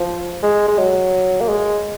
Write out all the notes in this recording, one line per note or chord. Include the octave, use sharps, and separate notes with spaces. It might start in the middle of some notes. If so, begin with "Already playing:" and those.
Already playing: F3
G#3
G#3
F#3
A#3
G#3